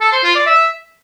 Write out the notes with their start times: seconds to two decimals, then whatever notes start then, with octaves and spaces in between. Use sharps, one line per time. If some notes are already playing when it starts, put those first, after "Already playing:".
0.01 A4
0.12 C5
0.24 F4
0.35 D5
0.47 E5